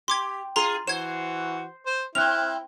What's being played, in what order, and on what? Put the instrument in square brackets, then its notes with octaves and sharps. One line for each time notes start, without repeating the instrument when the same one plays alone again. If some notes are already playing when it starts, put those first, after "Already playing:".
[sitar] G4 [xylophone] C6 D6 G#6
[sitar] F4 G#4 [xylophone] A#5 C6
[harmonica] E3 F#4 [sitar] C5 [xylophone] G#6 E7
[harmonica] C5
[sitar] C4 [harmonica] E4 [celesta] F6 F#6 [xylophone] F7